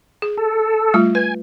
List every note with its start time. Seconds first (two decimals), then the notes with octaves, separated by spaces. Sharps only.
0.22 G#4
0.37 A4
0.94 G3 A3 F4
1.15 B4 G#5